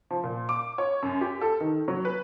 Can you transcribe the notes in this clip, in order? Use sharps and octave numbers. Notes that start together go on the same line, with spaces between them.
F3
A#2
D6
C#5
F#2
G4
A4
D#3
F#3
B4